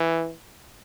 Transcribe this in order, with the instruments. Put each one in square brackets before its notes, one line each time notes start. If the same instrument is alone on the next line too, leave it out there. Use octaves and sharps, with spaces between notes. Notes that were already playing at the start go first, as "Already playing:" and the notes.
Already playing: [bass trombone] E3